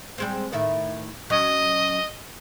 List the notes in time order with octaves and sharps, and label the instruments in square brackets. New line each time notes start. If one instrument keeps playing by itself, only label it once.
[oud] G3 G#3 C4
A2 D#3 E5
[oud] F#3 C#4 [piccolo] D#5